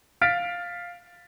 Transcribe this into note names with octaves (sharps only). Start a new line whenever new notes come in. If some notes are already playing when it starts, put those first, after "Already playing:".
F5 F6 A6 B6 D7